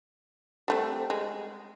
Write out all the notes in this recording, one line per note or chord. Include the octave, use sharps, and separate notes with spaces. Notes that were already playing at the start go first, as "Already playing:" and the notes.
G3 A3 C4
G#3